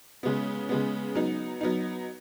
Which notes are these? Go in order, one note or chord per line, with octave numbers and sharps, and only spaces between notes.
C#3 G#3 B3
C#3 G#3 B3
F#3 B3 D#4
F#3 B3 D#4